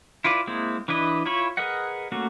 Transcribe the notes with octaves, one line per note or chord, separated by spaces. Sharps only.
E4 F4 B4 D5
G#3 A#3 C4 E4
E3 D4 E4 B4 D#5
E4 F4 C#5 B5 C#6
G#4 A#4 B4 D#5 F#5
A3 A#3 C#4 F#4